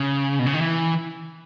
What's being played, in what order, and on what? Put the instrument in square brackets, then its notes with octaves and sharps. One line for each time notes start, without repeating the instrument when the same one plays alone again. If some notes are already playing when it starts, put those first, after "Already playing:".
Already playing: [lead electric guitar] C#3
B2
C#3
D#3
E3